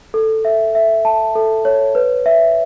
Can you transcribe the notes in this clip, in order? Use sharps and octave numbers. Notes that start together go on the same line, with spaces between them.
A4
E5
E5
A5
A4
C#5
B4
E5